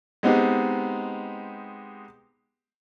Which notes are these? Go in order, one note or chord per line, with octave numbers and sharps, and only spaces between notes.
G#3 B3 C4 D#4 G4